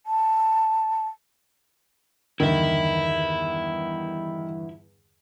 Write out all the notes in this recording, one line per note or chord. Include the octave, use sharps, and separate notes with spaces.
A5
E2 G2 D3 D#3 E4 E5